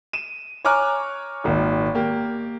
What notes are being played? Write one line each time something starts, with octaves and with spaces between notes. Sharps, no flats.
D#7 E7
C#5 G#5 A#5 D6 F6 F#6
G#1 A#2 D#3
A#3 G4